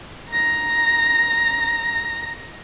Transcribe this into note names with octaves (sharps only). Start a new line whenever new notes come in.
A#5 A#6